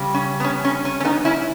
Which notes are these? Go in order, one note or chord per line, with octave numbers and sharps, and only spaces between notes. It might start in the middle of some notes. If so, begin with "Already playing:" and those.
Already playing: C#3 G3
C#4
B3
C#4
C#4
C#4
C#4
B3 D#4
C#4 E4